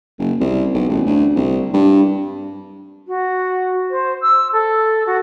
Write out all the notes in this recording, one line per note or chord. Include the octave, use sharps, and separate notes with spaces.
F#1
C2
B1
A1
D2
C2
G2
F#4
C5
E6
A4
F#4